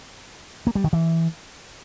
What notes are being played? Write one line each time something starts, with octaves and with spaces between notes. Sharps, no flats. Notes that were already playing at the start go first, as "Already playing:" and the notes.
A#3
G3
D#3
E3